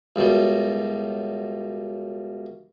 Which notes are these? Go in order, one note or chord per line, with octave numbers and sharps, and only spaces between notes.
C#2 F#2 B2 G3